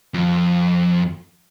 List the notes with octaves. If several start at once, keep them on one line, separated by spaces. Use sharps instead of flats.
F2